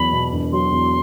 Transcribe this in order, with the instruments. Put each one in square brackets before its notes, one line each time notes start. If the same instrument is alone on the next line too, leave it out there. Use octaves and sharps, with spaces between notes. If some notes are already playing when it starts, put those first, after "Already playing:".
Already playing: [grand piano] E2 F#3 [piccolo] B5
[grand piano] B2
E1
[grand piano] F#3 [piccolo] C6
[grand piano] E2